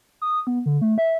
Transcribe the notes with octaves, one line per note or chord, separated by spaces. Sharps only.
D#6
B3
D3
A3
E5